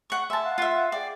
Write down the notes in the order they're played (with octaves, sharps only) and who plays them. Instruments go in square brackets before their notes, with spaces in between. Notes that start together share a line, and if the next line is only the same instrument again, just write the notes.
[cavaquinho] F#5 C#6
[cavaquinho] E5 A5 [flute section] G#5 C6
[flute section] F5 F#5 F#6
[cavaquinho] F4 E5
[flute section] G#4 G5 [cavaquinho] D5